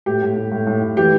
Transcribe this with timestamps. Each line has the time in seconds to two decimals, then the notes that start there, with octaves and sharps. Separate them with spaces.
0.06 A2 G4
0.22 A2
0.36 A2
0.52 A2
0.67 A2
0.82 A2
0.97 E3 G4